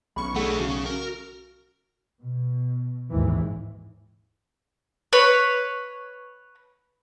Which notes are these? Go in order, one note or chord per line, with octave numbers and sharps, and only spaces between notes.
B1 C#4 B5 C#6
A3 D4 G#4 F#5
C#3 F#4
A#4
B2
G#1 D#2 G#2 E3
B4 C#5